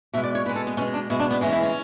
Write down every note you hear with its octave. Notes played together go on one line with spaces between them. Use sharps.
B2 G#3 E5
D5
C#5
B2 G#3 B4
A4
B3
B2 G#3 C#4
D4
B2 G#3 E4
D4
B3
C#3 E3 G#3 C#4
E4
C#4